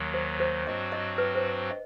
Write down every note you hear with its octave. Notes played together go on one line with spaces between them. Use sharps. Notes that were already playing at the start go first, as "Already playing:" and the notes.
Already playing: D#2 D#3 F#3
C5
C5
G2 F#3 C4 F#4 D#5
D#5
B4
C5
D#5